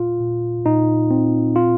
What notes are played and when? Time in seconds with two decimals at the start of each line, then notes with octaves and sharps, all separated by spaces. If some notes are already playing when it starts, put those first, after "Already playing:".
Already playing: A#2 F4
0.21 A#2
0.66 A#2 D#4
1.11 C4
1.56 F4